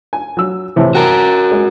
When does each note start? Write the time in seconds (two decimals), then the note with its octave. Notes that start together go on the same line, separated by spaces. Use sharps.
0.13 G#5
0.37 F#3 E6
0.76 A2 C3 E3
0.95 F#4 A#4 G5 A5
1.51 G#3